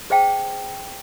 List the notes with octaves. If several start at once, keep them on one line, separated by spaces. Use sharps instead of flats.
G#4 C5 F5 G5 A5